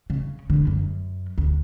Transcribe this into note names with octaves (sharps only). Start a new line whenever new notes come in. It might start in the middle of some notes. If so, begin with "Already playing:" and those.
C#3
D3
F#2
D2